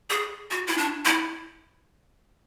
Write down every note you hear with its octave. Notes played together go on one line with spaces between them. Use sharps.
G#4
F#4
E4
D4
E4